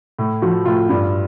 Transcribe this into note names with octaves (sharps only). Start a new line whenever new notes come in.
A2
F3 F#4
A2 F4
G2